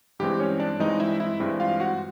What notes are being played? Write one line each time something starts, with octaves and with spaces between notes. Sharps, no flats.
G2 E3 G#3 C4 G4
C#4 C#5
D4 D5
G2 E3 G#3 C4 D#4 D#5
E4 E5
E4 E5
G2 E3 G#3 C4
F4 F5
F#4 F#5